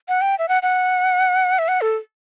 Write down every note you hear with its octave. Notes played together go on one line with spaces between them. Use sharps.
F#5
G5
E5
F#5
F#5
E5
F#5
A4